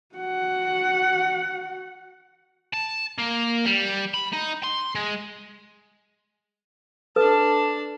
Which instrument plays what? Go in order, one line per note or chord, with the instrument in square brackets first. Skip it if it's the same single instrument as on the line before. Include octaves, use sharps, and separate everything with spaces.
[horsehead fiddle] F#4 F#5
[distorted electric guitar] A5
A#3
G3
B5
D#4
C6
G#3
[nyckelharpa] D4 A5 [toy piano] A4 B4